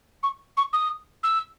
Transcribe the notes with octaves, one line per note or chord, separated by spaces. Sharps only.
C#6
C#6
D#6
E6